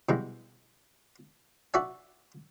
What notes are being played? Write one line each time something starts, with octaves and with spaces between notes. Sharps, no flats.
B2 E3 G3 G#3
F#4 D5 E5 G#5